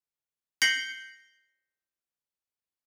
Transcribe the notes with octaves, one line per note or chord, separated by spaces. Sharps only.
G6 A#6 C7 C#7 F#7 G7